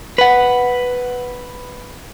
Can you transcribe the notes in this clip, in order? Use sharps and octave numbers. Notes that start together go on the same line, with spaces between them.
B4 F#5